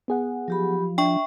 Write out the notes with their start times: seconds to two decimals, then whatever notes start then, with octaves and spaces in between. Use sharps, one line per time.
0.08 B3 G#4 F#5
0.48 F3 F#3 G4 B5
0.98 D4 E5 G5 C#6